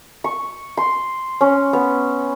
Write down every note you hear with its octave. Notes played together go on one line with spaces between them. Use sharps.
C#6
C6
C#4
B3